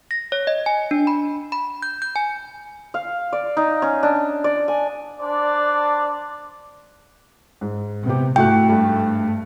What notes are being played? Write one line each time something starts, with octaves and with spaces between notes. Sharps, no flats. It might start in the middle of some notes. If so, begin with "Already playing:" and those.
A#6
C#5
D#5
G#5
D4
B5
B5
G6
G6
G#5
F5
D5
D#4
C#4
D4
D5
G#5
D4 C5 D5
G#2
C3 B3 G4
G#2 A3 E4 F#4 G5 F#6
G2